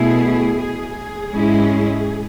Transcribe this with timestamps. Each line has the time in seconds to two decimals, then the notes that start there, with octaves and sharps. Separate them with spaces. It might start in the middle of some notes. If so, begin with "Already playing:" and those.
Already playing: B2 A3 E4 G#4
0.58 G#4
0.95 G#4
1.31 G#2 G#3 C#4 E4